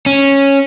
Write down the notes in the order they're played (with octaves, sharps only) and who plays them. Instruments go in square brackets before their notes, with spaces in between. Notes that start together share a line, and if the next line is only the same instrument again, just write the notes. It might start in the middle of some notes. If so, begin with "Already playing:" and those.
[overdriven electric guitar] C#4